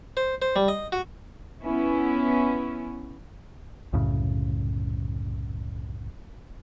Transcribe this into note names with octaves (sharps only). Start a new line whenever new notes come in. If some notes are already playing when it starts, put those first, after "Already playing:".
C5
C5
G3
D#5
F#4
B3 C#4 E4
C2 F#2 A2 C#3